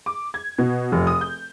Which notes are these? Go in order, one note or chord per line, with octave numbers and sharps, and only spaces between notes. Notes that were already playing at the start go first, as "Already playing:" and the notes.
D6
G#6
B2
F1
D#6
G6